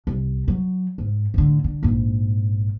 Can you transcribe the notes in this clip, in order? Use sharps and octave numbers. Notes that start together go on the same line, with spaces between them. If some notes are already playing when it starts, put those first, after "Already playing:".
C2
F#3
G#2
A2 D3
D3
A#1 G#2